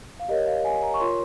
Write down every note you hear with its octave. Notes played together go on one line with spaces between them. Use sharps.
F5
G4 A#4 C#5 D#5
F5
G#5
A#5
C#6
F4 A#4 C#5 C6